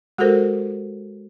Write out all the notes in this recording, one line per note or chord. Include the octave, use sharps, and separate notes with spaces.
G#3 F#4 G4 A4 A#4 C5